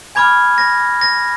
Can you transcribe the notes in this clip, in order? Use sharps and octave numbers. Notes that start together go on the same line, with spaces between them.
G#5 B5 D6 F6 G#6
A#6
A#6